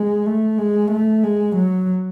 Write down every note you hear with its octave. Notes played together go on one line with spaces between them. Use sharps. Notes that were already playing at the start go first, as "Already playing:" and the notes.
Already playing: G#3
A3
G#3
A3
G#3
F#3